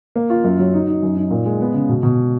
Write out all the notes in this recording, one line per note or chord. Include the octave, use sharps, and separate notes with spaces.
A#3
F4
F#2
F#3
D#4
D#4
F#2
D#4
A#2
G#3
B3
C#3
B2
B2